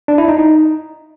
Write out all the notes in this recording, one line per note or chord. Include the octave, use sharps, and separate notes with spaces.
D4
E4
D#4
D#4